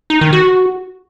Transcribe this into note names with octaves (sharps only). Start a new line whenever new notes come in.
D#4
D#3
F#4